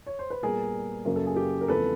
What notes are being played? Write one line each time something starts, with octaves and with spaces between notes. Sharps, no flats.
C#5
C5
B4
A#2 G3 B3 G#4 A#4
F#2 C#3 F#3 A#3 A#4
A4
G#4
G4 A4
A#4
E2 C#3 F3 A3 C4 A4 B4